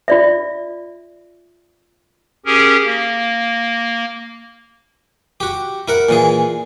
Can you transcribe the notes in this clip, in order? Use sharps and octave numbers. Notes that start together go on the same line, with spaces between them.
F4 D5 E5
C#4 G4 G#4 A#4
A#3
F#4 G4
E4 A#4 F#5
A#2 E3 G#4